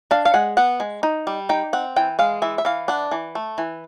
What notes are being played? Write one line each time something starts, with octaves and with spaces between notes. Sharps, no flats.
D4 F5
F5
G#3 F#5
B3 F#5
G#3
D#4
G3
D#4 G5
C4 F#5
E3 G5
G#3 F5
E3 E5
E5
E3 F5
D4 F#5
E3
A3
E3